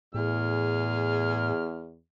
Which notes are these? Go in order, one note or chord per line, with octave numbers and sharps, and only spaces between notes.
E2 A2 G#4 F6